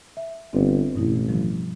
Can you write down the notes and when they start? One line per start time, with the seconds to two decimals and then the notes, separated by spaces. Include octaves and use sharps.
0.17 E5
0.53 G1 C4 B4
0.95 A1 G2 B2 E4
1.28 D#3 F3 G3